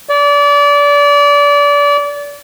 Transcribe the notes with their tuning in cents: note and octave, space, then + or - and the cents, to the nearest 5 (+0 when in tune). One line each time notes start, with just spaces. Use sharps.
D5 -30